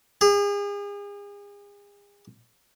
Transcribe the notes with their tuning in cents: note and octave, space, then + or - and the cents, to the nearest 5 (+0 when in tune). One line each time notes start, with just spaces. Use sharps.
G#4 -40